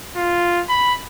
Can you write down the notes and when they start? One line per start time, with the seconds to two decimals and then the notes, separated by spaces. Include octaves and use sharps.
0.16 F4
0.69 B5